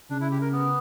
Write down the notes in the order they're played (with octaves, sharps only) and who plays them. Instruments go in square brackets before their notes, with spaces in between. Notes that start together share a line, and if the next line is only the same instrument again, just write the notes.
[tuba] C#3 [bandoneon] D4
[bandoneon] E4
G4
A#4
B3